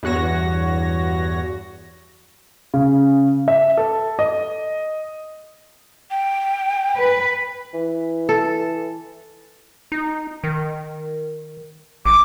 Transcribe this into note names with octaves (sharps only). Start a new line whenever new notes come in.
E2 G2 F#4 C#5 A#6
C#3
E5
A4
D#5
G5
B4
E3
A4
D#4
D#3
A1 D6